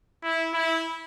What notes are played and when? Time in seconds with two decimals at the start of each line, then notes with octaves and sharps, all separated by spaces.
0.24 E4
0.53 E4